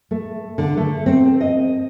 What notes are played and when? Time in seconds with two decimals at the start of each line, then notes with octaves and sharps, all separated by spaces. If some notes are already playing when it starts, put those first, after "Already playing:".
0.11 A3
0.58 D3
0.77 A3
1.06 C4
1.41 D#5